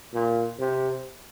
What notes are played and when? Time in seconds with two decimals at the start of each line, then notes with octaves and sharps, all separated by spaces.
0.13 A#2
0.59 C3